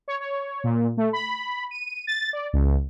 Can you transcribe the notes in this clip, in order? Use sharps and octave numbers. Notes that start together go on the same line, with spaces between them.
C#5
C#5
A#2
A3
B5
D#7
A6
D5
C#2